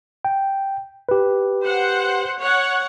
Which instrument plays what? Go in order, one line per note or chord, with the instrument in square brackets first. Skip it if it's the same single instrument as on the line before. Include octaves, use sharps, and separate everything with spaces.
[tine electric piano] G5
G4 B4
[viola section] C5 F#5
C#5 F#5